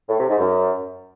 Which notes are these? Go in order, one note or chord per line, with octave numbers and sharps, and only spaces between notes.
A2
C3
G#2
F#2